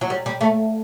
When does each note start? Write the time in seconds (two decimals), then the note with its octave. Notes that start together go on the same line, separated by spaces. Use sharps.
0.01 F#3
0.10 G3
0.26 G3
0.41 A3